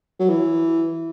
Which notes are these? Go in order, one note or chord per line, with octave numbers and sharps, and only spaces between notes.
F#3
E3